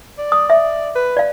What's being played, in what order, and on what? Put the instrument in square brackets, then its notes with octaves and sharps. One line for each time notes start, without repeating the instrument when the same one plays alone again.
[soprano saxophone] D5
[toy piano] D#6
E5
[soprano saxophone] B4
[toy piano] D5 F5